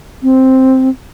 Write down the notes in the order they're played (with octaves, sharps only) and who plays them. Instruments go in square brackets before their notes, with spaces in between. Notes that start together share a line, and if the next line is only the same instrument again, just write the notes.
[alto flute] C4